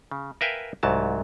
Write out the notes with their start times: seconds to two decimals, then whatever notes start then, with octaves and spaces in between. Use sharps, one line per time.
0.11 C#3
0.41 A#4 B4 E5 F5 G5 G#5
0.83 C2 G#2 F#3 A5